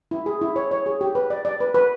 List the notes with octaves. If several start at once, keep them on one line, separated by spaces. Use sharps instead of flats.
E4
G#4
E4
C#5
C#5
G#4
G4
B4
D5
D5
B4
B4